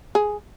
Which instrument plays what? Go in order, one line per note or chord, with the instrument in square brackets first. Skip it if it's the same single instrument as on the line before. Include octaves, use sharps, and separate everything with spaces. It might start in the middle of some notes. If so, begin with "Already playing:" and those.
[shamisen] G#4